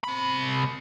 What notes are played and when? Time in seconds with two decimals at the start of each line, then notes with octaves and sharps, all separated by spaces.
0.04 C3 B5